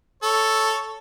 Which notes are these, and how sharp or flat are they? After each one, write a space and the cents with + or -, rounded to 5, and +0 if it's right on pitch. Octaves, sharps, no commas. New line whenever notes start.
A4 +0 C#5 +0